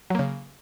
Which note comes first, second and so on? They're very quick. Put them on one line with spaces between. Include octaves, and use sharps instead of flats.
F#3 A#3 C#3